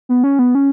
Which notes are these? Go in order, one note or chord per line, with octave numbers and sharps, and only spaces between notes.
B3
C#4
B3
C#4